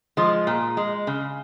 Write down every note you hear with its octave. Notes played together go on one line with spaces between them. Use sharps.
F3 G#3
A#2
G#3
C#3